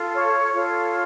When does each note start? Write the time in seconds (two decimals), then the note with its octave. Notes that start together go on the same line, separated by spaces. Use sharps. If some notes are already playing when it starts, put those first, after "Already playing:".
Already playing: F4 A4
0.14 C#5
0.53 F4 A4 C#5